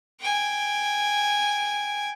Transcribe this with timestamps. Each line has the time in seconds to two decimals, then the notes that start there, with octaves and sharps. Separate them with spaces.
0.20 G5 G#5